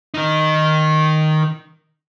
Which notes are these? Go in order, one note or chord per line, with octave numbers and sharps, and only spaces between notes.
D#3 D#4